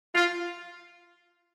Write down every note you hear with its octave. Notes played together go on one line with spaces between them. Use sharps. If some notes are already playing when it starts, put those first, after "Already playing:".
F4